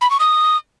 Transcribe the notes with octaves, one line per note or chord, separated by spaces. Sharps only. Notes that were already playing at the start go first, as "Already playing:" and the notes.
B5
C#6
D#6